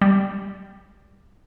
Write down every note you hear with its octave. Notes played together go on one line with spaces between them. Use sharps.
G3